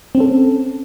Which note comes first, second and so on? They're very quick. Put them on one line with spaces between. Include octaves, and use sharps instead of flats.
C4 C#4 A4